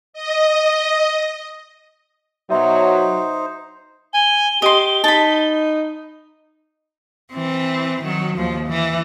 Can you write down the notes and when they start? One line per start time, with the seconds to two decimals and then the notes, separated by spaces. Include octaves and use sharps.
0.13 D#5
2.50 B2 F#3 D#4 C5 E5
4.14 G#5 G7
4.62 G4 D#5 C6
5.04 D#4 A5 B5
7.32 E3 C4
8.03 D#3 F#3
8.37 D#2 F3
8.68 E3